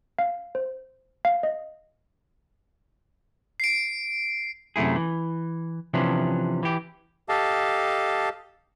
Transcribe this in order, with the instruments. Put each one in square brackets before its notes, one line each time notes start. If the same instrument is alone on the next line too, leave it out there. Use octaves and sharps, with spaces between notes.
[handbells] F5
C5
F5
D#5
[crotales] C7 D7
[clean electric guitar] F#2 C3 A3 E4 G#4
E3
C3 E3 F3 C#4 D4
E3 G4
[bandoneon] G4 A4 D#5 F5 A5